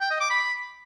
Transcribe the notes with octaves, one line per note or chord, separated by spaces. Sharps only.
G5
D#5
D6
B5